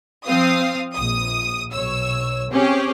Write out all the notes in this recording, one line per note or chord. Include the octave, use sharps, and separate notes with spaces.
F3 C4 F5 D#6
A#1 D#6
B1 C#5 E6
C4 C#4 G4 G#4